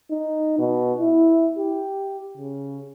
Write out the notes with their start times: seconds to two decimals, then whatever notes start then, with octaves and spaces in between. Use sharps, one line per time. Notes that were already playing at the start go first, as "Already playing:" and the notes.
0.11 D#4
0.59 B2
0.99 E4
1.59 G4
2.37 C#3